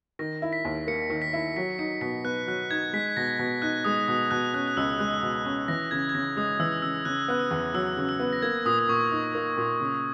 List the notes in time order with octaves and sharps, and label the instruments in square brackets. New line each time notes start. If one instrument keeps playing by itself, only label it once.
[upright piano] D#3 [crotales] A#6
[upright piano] E4
[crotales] B6
[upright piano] D#2
[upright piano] A#3 [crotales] C#7
[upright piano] D#3
[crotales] B6
[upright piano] E4
[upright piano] F#3 [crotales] B6
[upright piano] D#4 [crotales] C#7
[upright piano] B2 [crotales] B6
[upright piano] B3 [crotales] F#6
[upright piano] F#3 [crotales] F#6
[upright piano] D#4 [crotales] G#6
[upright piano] G#3 [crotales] B6
[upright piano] B2 [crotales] A#6
[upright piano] B2
[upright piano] D#4 [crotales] F#6
[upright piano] G#3 [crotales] D#6
[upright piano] B2 [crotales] D#6
[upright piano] B2 [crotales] F#6
[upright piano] C#4 [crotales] F#6
[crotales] F#6
[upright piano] C#2 [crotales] E6
[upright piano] G#3 [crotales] F#6
[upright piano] B2
C#4
[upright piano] E3 [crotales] A#6
[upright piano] C#3 [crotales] G#6
[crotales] G#6
[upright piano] C#3 [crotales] A#6
[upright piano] G#3 [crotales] D#6
[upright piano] E3 [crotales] E6
[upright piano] C#3 [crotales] E6
[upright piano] C#3 [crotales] F#6
[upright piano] B3 [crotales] F#6
[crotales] E6
[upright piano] E2
[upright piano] F#3 [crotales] E6
[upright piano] C#3
[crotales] E6
[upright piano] B3
[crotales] A#6
[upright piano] A#3 [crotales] G#6
[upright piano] A#2 [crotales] D#6
[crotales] D#6
[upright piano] A#2 [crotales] C#6
[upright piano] D#4
A#3
A#2
C#3